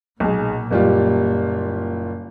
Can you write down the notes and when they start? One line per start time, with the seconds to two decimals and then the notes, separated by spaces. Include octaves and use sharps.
0.20 B1 A#2 G#4
0.71 F#1 G3 F4